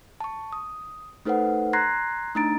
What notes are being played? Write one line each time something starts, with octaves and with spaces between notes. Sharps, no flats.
A5 C#6
D#6
A3 D#4 A4 B4 C5 F#5
A#5 C6 F#6 G#6 A#6 C7
A3 D4 D#4 A#5 A6 D7